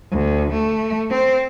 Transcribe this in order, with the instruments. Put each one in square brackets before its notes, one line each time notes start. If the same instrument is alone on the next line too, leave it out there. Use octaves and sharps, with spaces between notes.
[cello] D2
A3
C4 C5